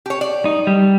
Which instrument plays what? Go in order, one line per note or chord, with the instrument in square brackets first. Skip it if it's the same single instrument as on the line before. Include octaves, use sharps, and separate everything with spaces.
[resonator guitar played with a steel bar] G4 C#5
D5
[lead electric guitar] D#4
G3